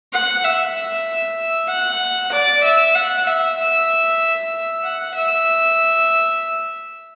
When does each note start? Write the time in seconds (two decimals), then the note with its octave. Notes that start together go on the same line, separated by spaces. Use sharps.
0.13 F#5
0.44 E5
1.69 F#5
2.33 D5
2.65 E5
2.95 F#5
3.27 E5
3.59 E5
4.84 F#5
5.15 E5